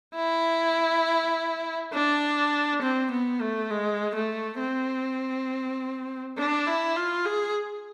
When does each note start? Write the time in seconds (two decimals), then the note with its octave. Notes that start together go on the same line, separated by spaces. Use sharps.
0.15 E4
1.94 D4
2.82 C4
3.11 B3
3.41 A3
3.71 G#3
4.15 A3
4.59 C4
6.38 D4
6.67 E4
6.96 F4
7.26 G#4